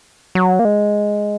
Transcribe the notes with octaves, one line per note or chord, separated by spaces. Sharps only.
F#3
A#3
G#3